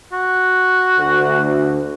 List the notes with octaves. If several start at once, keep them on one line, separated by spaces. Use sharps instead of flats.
F#4
D2